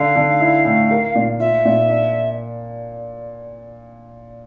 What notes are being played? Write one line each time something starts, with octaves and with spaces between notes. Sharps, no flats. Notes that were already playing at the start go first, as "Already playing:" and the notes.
Already playing: D3 F5
D3
E4
A2
A#4
A#2
F4 E5
A#2
D4